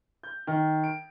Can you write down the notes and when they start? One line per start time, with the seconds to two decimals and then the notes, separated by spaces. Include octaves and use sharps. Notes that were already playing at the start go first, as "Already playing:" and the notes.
0.23 G6
0.47 D#3
0.83 D7